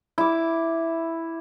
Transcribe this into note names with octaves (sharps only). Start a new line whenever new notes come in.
E4 D6